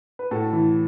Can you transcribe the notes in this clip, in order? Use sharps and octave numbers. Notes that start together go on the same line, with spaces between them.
B4
A2 F#4 A4
E3